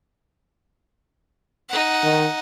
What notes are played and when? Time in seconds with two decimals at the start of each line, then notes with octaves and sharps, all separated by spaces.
1.69 D#4 F#5
2.03 D#3